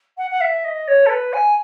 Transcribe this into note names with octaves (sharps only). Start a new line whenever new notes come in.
F#5
F#5
E5
D#5
C#5
A4
B4
G#5